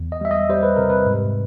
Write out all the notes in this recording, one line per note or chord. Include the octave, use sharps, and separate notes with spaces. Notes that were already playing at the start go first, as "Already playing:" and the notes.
Already playing: E2
D#5
G3 E5
D#5
G3 C5
B4
C3 A#4
B4
G#2